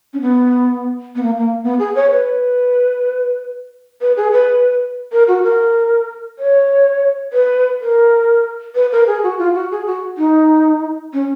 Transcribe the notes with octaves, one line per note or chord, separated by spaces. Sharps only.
C#4
B3
B3
A#3
A#3
B3
G#4
C#5
B4
B4
G#4
B4
A#4
F#4
A#4
C#5
B4
A#4
B4
A#4
G#4
F#4
F4
F#4
G#4
F#4
D#4
C#4